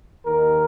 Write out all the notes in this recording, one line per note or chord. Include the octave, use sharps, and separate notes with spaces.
D#2 D#3 A#4